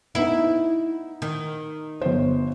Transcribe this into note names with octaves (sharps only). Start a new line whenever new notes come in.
B3 D#4 E4
D#3
G1 C5